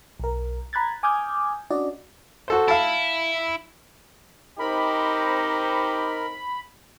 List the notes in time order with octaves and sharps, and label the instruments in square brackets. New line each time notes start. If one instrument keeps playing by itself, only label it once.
[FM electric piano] B1 A#4
A#5 B5 F#6 G#6 A6
G#5 D6 D#6 F6 G6 G#6
C#4 D4 F#4 D5 D#5
[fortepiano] F#4 A4 C5
[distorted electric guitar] E4 [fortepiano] F5 A5
[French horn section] C4 D#4 [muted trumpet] G4 [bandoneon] A#4 [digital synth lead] B5